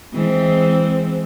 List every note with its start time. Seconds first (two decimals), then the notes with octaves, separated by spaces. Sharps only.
0.13 E3 G#3 C4